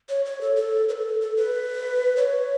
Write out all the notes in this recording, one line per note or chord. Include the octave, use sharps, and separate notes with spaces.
C#5
C#5
A4
A4
B4
A4
A4
B4
C#5